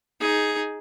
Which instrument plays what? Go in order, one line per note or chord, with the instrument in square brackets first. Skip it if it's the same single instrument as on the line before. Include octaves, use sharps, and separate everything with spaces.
[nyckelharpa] D#4 G#4